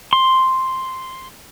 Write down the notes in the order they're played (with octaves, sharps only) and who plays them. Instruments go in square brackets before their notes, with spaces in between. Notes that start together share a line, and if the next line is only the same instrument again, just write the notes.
[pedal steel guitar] C6